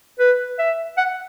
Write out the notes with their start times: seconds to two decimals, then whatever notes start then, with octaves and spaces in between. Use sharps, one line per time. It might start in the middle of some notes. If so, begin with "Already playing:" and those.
0.20 B4
0.59 E5
0.98 F#5